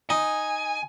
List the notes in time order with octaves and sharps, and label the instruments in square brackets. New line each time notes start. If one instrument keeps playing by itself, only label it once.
[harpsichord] D#4 [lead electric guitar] G#5